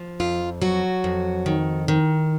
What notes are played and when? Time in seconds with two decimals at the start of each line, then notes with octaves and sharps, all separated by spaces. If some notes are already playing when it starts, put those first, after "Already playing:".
Already playing: F3
0.20 F2 F4
0.62 F#3 F#4
1.04 F2
1.46 D#3
1.88 D#3